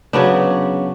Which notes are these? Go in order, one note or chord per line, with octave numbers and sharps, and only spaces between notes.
C#3 F#3 B3 D4